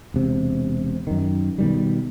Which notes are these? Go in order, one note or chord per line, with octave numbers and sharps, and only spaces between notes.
E1 C3
F#2 D#3
B2 D#3 G3